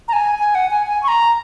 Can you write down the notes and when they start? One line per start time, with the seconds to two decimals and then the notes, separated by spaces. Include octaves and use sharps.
0.08 A#5
0.13 G#5
0.39 G#5
0.55 F#5
0.71 G#5
0.87 G#5
1.03 C#6
1.08 A#5